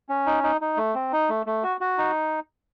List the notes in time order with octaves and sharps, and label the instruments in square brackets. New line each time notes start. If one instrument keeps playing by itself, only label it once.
[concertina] C#4
D#4
D#4
D#4
A3
C4
D#4
A3
A3
F#4
F#4
D#4